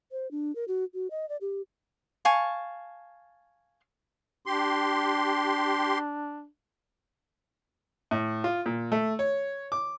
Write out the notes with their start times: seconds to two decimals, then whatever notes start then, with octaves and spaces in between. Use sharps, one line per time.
0.12 C5
0.31 D4
0.56 A#4
0.68 F#4
0.94 F#4
1.11 D#5
1.29 D5
1.41 G4
2.25 F5 G#5 A5 C#6
4.46 D4 G4 C6
8.11 A2
8.44 F4
8.66 A#2
8.92 A3
9.19 C#5
9.72 D6